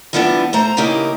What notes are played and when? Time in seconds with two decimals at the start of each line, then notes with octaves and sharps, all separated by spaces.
0.13 E3 F3 G3 B3 C#4 D4
0.53 A3 C5 A#5
0.77 C#3 E3 A#3 D#4 G4 A#4